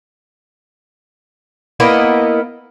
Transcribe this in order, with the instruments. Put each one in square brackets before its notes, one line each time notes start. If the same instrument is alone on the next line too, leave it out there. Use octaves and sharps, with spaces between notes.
[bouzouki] A#3 B3 E4 D#5